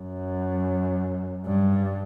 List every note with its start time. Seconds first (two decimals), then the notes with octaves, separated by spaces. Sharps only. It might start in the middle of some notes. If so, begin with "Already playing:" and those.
Already playing: F#2
1.46 G2